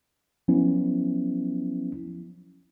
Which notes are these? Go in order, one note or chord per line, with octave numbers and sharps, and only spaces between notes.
F3 F#3 B3 C#4 E4